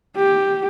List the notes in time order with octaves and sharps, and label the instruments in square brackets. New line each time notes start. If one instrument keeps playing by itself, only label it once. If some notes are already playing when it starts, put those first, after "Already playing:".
[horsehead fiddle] G4